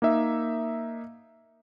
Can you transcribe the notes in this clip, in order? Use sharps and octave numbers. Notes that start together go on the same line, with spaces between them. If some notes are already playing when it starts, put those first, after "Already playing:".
A#3 D#4 E5